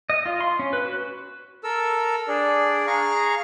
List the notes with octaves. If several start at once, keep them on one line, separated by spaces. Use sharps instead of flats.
D#5
F4
C6
C#4
B4
F#4
A4 A#4 E6
D4 G#4 D5
G#4 F5 A#5 C#6 F6